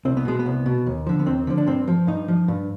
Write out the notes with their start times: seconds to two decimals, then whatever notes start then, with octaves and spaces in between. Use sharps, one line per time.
0.05 C2 C4
0.17 B3
0.25 B2 G#3
0.39 B3
0.46 C2
0.66 B2
0.86 D#2
1.07 D3 F3
1.19 B3
1.26 D#2 C4
1.47 D3 F3
1.58 D4
1.67 G2 C4
1.88 F3
2.07 G2 D#4
2.28 F3
2.48 G2